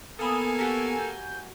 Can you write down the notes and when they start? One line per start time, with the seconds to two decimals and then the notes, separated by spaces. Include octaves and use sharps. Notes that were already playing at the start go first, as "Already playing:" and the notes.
0.19 A#3 B3 A4 G#5 B5 D#6
0.58 F#4 G4 A#4
0.99 G6